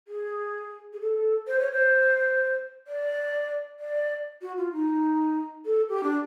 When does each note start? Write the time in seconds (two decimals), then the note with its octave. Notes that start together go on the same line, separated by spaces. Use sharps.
0.08 G#4
0.93 G#4
1.01 A4
1.47 C5
1.59 C#5
1.72 C5
2.87 D5
3.80 D5
4.42 F#4
4.57 F4
4.73 D#4
5.66 A4
5.89 G4
6.03 D4